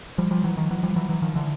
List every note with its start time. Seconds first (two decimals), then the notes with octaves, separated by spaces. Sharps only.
0.18 F3 G3
0.31 F3 G3
0.44 E3 F#3
0.57 D#3 F3
0.71 E3 F#3
0.83 F3 G3
0.96 E3 F#3
1.09 E3 F#3
1.22 D#3 F3
1.35 D3 E3